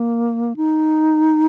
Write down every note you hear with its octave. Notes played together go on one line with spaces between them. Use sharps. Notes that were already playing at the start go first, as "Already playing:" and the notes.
Already playing: A#3
D#4